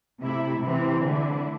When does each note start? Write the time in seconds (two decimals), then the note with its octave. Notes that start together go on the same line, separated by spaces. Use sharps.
0.20 C3 A3 E4
0.62 C3 E3 C4 E4
1.05 D3 A3 E4